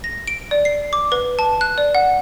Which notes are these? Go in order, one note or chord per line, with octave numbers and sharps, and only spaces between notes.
A#6
D7
D5
C7
D6
B4
A5
F#6
D5
F#5